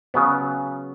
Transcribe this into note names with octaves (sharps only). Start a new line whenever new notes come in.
C#3 F#3 B3